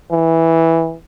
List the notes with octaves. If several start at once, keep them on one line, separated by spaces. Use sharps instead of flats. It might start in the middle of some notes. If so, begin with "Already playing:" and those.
E3